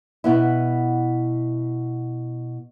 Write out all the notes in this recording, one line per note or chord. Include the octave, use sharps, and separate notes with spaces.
B2 B3 E4